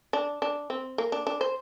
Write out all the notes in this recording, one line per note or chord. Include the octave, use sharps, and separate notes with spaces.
D4
D4
C4
A#3
D4
D4
C5